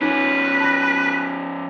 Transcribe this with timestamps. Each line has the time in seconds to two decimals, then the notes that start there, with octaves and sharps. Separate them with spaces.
0.02 F3 C#4 D#4 B4
0.60 A5 B5 A#6